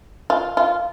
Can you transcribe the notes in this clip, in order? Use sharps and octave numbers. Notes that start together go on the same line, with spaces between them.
F4
F4